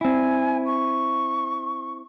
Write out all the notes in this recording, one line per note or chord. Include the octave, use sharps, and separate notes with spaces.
C4 E4 G#5
C#6